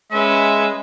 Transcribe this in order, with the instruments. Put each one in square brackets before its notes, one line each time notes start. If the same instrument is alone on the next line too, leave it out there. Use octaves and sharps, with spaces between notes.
[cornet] G#3 [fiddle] C#4 B4 [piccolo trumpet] E5